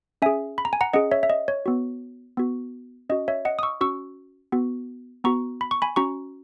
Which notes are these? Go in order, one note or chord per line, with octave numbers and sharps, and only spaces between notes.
C#4 G#4 E5 G#5
B5
A#5
G#5
F#5 A#5
C#4 G#4 D#5 F#5
C#5 E5
E5
D#5
C#5
B3 F#4
B3 F#4
C#4 F#4 D#5
C#5 E5
D#5 F#5
D#6
C#6 E6
C#4 F#4 C#6 E6
B3 F#4
B3 F#4 A#5 C#6
B5
C#6
G#5 B5
C#4 F#4 A#5 C#6